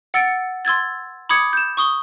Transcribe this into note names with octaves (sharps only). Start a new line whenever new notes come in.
F#5 E6 A6 C#7 D7
C6 E6 G#6 A6
B5 D6 D#6 G#6 C#7
G6 E7
C#6 D#6 G7